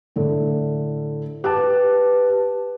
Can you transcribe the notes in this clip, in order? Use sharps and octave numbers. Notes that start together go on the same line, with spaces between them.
A2 D3
G4 B4 A5 D6 F#6